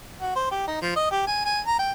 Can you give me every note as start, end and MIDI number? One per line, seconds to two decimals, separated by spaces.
0.21 0.35 66
0.36 0.49 72
0.51 0.66 67
0.67 0.80 63
0.81 0.95 53
0.96 1.06 75
1.11 1.22 67
1.27 1.42 80
1.45 1.61 80
1.66 1.78 82
1.79 1.92 79